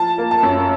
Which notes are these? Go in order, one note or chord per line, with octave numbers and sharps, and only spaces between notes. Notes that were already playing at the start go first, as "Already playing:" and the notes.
Already playing: F3 A5
A#3
A5
F#2